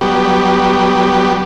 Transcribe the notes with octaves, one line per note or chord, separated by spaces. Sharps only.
F#3 G3 B3 G4